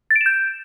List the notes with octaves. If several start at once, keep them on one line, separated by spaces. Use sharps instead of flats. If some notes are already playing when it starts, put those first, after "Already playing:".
A6
D7
E7
G6